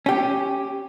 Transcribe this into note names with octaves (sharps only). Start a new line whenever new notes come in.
C#4 G4